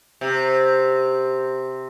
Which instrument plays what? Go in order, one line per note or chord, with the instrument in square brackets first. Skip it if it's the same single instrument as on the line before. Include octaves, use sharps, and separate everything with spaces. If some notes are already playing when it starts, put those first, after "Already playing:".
[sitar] C3